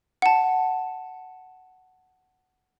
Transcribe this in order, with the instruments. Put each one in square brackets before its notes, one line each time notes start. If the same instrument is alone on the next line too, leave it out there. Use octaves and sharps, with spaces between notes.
[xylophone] F#5 A5